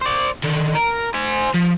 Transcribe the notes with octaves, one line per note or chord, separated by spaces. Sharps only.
C5 D5
D3 D#3
A#4
C5 G#5
F3